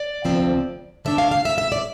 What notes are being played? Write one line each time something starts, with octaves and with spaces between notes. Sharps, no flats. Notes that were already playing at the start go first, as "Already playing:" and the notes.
Already playing: D5
D2 C3 F3 C4
D3 A3 D4 E5
F5
F5
E5
E5
D5